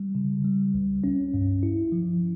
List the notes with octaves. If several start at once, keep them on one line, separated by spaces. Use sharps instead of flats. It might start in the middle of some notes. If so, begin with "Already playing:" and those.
Already playing: G3
C#3
G3
C#2
C#4
G2
E4
F3